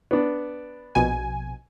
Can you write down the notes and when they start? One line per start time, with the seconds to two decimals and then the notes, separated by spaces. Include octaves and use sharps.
0.11 B3 D4
0.95 A#1 B2 G#5